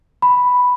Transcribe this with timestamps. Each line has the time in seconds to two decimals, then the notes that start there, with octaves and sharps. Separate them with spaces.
0.22 B5